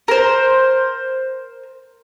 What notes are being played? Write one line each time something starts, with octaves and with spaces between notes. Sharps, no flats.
A#4 C5